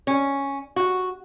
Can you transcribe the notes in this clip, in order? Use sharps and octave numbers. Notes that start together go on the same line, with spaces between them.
C#4
F#4